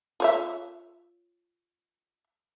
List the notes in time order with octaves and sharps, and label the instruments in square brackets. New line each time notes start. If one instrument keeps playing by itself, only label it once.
[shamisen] F4 C#5 E5